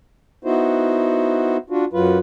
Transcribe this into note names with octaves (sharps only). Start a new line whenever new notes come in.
B3 D#4 E4 F#4 C5
D4 F4 F#4
F#2 F#3 F4 B4